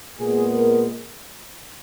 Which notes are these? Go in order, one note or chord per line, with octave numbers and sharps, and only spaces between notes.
A#2 G#3 B3 G#4
A#4